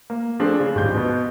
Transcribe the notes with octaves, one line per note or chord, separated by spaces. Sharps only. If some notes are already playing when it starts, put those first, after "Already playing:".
A#3
F3 A3 C4 D4 G#4
C#3
D1 G#1 G3 F4 G4 G6
B2 B3